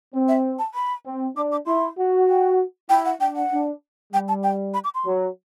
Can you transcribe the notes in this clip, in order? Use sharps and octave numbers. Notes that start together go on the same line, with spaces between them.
C4
E5
A5
B5
C4
D4 D6
D6
E4 C6
F#4
G5
E4 G5
F#5
D4 G5
F#5
D4
G3 G5
A5
G5
B5
D6
C6
F#3